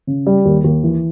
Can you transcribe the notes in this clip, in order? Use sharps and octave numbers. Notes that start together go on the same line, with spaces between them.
C#3
G3
D#2
D#2
E3